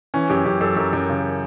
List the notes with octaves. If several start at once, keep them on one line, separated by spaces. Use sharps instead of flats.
E3 C#4
F#2 G4
F#2 G4
F#2 A4
F#2 A#4
F#2
C#3